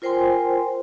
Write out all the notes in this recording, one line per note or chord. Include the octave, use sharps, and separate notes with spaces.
F4 A#4 C5 G5 G#5 C6